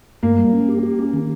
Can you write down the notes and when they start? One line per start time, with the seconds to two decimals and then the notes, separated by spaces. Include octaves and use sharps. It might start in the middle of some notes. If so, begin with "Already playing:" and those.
0.23 G2 A#3
0.38 G3
0.53 C#4
0.68 G4
0.83 G4
0.99 C#4
1.13 D#3